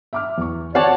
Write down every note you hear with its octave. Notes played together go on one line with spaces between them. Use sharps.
E5 D6 F6
E2 C#6
F#4 C#5 D5 F#5 A5 C7